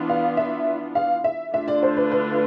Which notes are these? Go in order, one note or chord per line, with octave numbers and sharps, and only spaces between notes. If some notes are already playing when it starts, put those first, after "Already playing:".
Already playing: E3 B3 D4 F4
F5
E5
F5
E5
D3 A3 D4 F4 E5
D5
C5
B4
B4